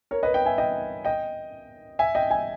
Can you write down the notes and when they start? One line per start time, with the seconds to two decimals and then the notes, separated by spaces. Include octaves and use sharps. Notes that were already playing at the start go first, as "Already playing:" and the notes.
0.11 A#4 C#5
0.23 B4 D#5
0.34 D#5 G5
0.46 E5 G#5
0.58 D#5 G5
1.05 D#5 G5
1.99 E5 G#5
2.15 D#5 G5
2.30 E5 G#5